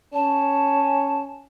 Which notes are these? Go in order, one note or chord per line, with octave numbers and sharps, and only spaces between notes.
C#4 A5